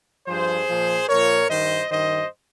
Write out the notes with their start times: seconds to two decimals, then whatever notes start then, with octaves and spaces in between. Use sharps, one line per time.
0.27 G2 F3 G#4 C5
0.68 A#2 F3
1.08 A#2 F3 A#4 C#5
1.49 G2 D#3 C5 D#5
1.90 G2 D#3 C5 D#5